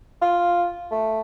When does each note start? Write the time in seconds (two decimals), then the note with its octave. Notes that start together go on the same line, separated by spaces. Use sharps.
0.22 F4
0.91 A3